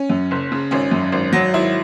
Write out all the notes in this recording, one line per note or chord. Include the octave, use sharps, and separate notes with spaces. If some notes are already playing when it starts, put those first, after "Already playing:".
Already playing: C#4
F#2
F#1
C#3
G#1 C#4
F#2
G#1
F#3
G#1 E4